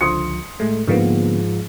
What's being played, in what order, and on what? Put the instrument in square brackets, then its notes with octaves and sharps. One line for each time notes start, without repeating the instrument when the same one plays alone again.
[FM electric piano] C#2 D3 F3 [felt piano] C6 D#6 C#7
[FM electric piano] A2 G#3 A3
[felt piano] G#2 F3 [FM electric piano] D3 A#3 B3